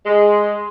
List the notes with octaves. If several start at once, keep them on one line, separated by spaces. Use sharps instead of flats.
G#3